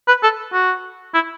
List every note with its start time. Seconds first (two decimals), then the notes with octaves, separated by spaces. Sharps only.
0.08 B4
0.23 A4
0.54 F#4
1.15 E4